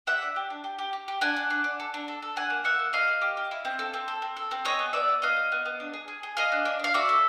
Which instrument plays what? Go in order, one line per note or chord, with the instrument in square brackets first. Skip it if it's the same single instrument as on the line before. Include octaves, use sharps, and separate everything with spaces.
[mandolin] G4 E5 F#5
D4
G4
D4
G4
G4
G4
G4
D4 F#5 G#5
D4
D4
D4
A4
D4
A4
A4
D4 F#5 G#5
A#3
A#3 E5 F#5
A#3
A#3 D#5 F5
A#3
G4
G4
E4
C4
A4
C4
A4
C4
A4
C4
G#4 C#5 D#5
B3
B3 D5 E5
B3
B3 D#5 F5
B3
B3
B3
D4
G#4
G#4
G#4
G#4 D#5 F5
D4
D4
D4 F5
F#4 D5 E5
A4